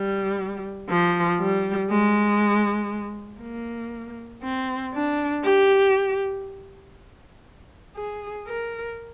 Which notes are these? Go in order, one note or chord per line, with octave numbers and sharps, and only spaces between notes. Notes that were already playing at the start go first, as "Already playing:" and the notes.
Already playing: G3
F3
G3
G#3
A#3
C4
D4
G4
G#4
A#4